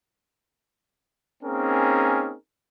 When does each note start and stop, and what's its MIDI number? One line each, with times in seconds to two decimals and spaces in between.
1.43 2.34 58
1.43 2.34 60
1.43 2.34 61
1.43 2.34 63
1.43 2.34 68
1.43 2.34 70